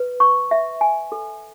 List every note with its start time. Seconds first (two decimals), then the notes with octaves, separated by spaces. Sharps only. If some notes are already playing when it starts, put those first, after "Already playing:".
Already playing: B4
0.20 C#6
0.51 E5
0.81 G#5
1.12 A4